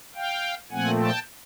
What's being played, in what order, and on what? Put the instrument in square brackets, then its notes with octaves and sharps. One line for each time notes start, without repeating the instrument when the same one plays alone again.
[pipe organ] F5 G5
A#2 F3 A3 C4 F#5 G#5
G5 A5